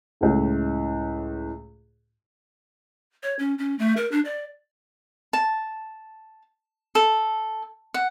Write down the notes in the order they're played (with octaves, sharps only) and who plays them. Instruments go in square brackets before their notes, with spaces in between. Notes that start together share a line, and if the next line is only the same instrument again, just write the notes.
[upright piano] C#2 A2
[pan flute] C#5
C#4
C#4
A3
A#4
D4
D5
[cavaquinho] A5
A4
F#5